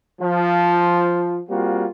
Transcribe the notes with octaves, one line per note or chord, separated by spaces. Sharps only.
F3
G3 A#3 C4 F4 F#4